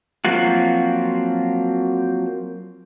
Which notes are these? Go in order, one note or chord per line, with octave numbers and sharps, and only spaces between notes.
F3 F#3 A#3 C4 F4 F#4